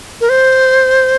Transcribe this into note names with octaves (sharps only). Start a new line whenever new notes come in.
A#4
C5